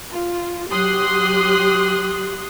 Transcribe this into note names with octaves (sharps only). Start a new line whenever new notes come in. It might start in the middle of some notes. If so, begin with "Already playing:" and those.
F4
F#3 G4 C6 D#6 F#6